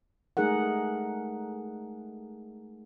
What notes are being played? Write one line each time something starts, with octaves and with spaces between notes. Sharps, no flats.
G#3 A3 D#4 G#4 A#4 F#5